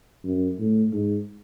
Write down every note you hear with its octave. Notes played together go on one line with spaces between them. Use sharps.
F#2
A2
G#2